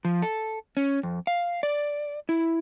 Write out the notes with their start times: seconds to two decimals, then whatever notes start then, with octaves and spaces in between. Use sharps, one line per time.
0.05 F3
0.22 A4
0.77 C#4
1.03 F2
1.27 F5
1.63 D5
2.29 E4